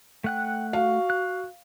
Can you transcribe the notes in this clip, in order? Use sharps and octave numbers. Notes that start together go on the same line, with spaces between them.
A3 F#5 G5 F#6
F#4 F5
F#6